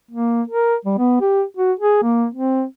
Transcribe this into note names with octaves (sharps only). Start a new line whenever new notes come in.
A#3
A#4
G3
B3
G4
F#4
G#4
A#3
C4